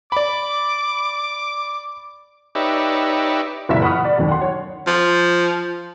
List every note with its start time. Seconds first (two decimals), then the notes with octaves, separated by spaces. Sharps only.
0.12 D5 B5 D6
2.55 D#4 G4 B4 C#5 D5 E5
3.69 F#1 A#2 E3 E5 B6
3.82 F#5 B5 C#6 D#6 F6
4.05 D5
4.17 D#2 D3 F#3
4.29 F#5 C6
4.41 C#5
4.87 F3